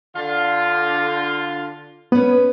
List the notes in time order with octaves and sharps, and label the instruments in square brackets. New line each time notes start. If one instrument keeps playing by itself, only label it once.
[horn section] D3 F4
[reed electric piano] B3 [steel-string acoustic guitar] C#4 B4